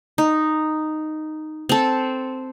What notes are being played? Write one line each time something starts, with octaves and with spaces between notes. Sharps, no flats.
D#4
C4 A4